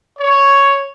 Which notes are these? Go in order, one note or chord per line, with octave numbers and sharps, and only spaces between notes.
C#5